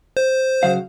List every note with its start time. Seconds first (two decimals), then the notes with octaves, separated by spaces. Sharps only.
0.17 C5
0.63 C#3 F#3 F5